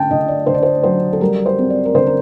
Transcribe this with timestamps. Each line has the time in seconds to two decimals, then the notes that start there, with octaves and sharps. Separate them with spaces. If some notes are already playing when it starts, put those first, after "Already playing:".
Already playing: D3 G5 A5
0.11 D3 D#5
0.28 D5
0.46 D3 C5
0.54 D5
0.63 C5
0.83 F#3 C5
1.13 A4
1.20 G3 A#4
1.46 C5
1.59 C4
1.70 D5
1.85 A#4
1.94 D3 C5
2.07 A#4